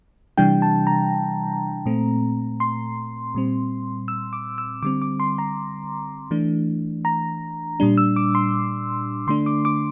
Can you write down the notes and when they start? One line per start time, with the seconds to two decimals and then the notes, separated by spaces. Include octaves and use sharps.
0.37 C3 E3 G3 D4 G5
0.62 A5
0.87 A#5
1.86 A#2 A3 C4
2.60 C6
3.35 A#2 G3 C4
4.08 E6
4.33 D6
4.58 E6
4.83 D3 G3 C4 D6
5.02 D6
5.20 C6
5.38 A#5
6.31 E3 A3 D4
7.05 A#5
7.80 A#2 G3 D4
7.98 E6
8.16 D6
8.35 C6
9.27 D3 A3 D4 C6
9.46 D6
9.65 D6